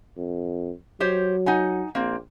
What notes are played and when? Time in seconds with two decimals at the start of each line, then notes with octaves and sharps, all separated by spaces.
0.17 F2
1.00 F#3 G4 C5 C#5
1.46 D#4 F#5 G#5
1.95 A#1 A#3 C4